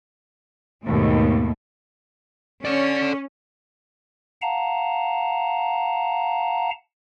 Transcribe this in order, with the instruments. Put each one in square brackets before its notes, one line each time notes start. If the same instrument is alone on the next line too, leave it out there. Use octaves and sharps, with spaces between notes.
[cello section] D#2 G#2 B2 A3
[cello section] C#4 [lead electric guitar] A4 D5
[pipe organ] F5 F#5 A5 A#5